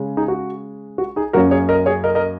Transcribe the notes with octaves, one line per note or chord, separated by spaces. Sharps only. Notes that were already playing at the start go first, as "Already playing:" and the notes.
Already playing: C#3 G#3 C#4
D#4 G#4
F#4
F#4
D#4 G#4
F#2 F#3 A#3 C#4 F#4 A#4
G#4 C#5
A#4 D#5
G#4 C#5
A#4 D#5
A#4 D#5